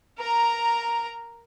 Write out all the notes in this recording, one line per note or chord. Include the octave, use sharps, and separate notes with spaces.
A#4 A#5